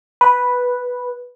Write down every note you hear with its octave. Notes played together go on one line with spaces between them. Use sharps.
B4